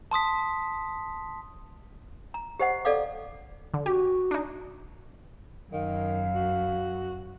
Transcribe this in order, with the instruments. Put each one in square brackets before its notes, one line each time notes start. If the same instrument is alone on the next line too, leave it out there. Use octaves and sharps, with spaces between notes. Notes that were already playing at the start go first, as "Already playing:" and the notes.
[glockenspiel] A5 C6 D#6 B6
[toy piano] A#5
G4 C5 D#5 F#5
A4 D5 D#5 F5 D6
[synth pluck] D3
[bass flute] F#4 [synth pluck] G4
[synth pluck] D4 D#4
[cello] F#2 [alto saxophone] D#3 [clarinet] F5
[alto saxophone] F#4